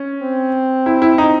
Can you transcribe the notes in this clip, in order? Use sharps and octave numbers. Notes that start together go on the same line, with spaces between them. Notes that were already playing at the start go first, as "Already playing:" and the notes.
Already playing: C#4
C4
E4
E4
D#4